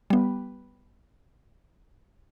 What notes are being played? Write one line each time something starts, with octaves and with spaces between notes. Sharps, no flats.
G3 B3